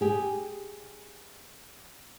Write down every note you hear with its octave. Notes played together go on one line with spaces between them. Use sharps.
G4 G#4